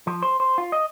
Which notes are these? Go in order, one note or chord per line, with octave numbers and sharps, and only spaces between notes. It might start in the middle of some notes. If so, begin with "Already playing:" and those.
F3
C5
C5
F4
D#5